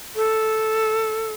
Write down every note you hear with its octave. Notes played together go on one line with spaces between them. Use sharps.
A4